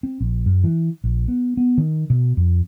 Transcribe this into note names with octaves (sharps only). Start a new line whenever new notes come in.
C4
A#1
F#2
E3
A#1
B3
B3
D#3
B2
F2